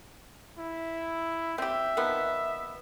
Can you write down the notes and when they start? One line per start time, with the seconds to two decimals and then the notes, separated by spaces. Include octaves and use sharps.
0.58 E4
1.58 C4 G4 E5
1.97 D#3 F3 B3